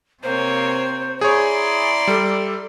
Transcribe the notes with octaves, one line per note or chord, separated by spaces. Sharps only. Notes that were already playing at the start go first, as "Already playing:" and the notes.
C3 A#3 C4 C5 C#5
E4 G#4 C#5 D5 A#5 C6
G3 A4